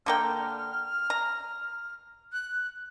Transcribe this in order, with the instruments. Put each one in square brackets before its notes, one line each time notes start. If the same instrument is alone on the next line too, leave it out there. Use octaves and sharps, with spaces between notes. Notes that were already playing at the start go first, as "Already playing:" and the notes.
[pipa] D3 A#3 G5 [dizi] F6
[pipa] A#5
[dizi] F#6